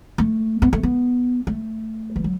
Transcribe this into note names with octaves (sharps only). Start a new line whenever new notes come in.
A3
B3
A3
B3
A3
E3
F#3